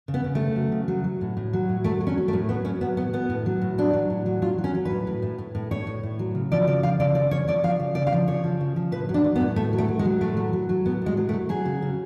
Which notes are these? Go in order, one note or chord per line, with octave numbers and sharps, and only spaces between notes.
C#3
B3
C#3
A3
C#3
F#3
C#3
F#3
F#3
A2
A2
F#3
A2
F#3 A3
F#3
C#4
F#3
A3
A2
F#3 B3
A2 C#4
F#3 B3
A2 B3
A2 B3
A2
F#3
A2
F#3 D4
F#3
A2
F#3
F#3 F4
F#3
C#4
F#3
A2 B4
A2
A2
A2
A2
A2 C#5
A2
A2
F#3
C#3
F3 D5
C#3 D5
F3 F5
C#3 D5
C#3 D5
F3 C#5
F3 D5
F3 F5
C#3
C#3 D5
F5
F3
C#3 C#5
F3
C#3
F3
A2 B4
F#3
D4
F#3
B3
A2
A2 A3
F#3
A3
F#3
G#3
F#3
A2 A3
F#3
F#3
F#3
A2 B3
A2 G#3
F#3
A3
F#3
F#3 G#4
C#3
C#3